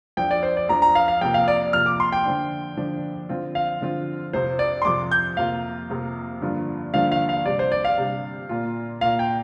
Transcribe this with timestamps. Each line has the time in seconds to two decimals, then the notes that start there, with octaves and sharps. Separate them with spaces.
0.17 F2 F3 D4 G5
0.31 D5
0.43 C5
0.57 D5
0.69 F2 F3 D4 A#5
0.82 A#5
0.95 F5
1.08 F5
1.21 F2 C3 A#3 G5
1.34 F5
1.48 D5
1.73 F2 C3 A#3 F6
1.86 D6
2.00 C6
2.12 G5
2.25 D3 F3 D4
2.77 D3 F3 D4
3.29 D3 F3 C4 F4
3.55 F5
3.81 D3 F3 C4 F4
4.33 F2 C3 F3 C5
4.59 D5
4.82 C6
4.85 F2 C3 F3 D6
5.11 G6
5.37 F2 C3 A#3 F4 F5
5.90 F2 C3 A#3 F4
6.42 G2 D3 F3 A#3 F4
6.94 G2 D3 F3 A#3 F4 F5
7.12 F5
7.29 F5
7.46 C3 G3 D4 D5
7.59 C5
7.72 D5
7.85 F5
7.98 C3 G3 D4
8.49 A#2 A#3 F4
9.01 A#2 A#3 F4 F5
9.19 G5